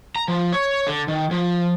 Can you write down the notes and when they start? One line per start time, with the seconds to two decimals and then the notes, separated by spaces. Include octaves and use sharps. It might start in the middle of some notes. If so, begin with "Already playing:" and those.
0.16 A#5
0.28 F3
0.52 C#5
0.87 D3
1.08 D#3
1.31 F3